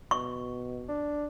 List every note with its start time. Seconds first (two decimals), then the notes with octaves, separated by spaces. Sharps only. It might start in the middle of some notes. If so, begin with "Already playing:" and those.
0.11 B2 C#6
0.89 D4